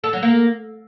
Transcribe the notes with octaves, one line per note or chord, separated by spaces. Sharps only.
A4
F#3
A#3